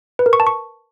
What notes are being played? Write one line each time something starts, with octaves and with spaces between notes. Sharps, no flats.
B4
A#4
C#6
A5
C#6